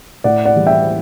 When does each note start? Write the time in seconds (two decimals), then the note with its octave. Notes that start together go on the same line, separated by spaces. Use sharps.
0.24 A2 D5 F#5
0.45 D5 F#5
0.56 E3 G3
0.67 E5 G5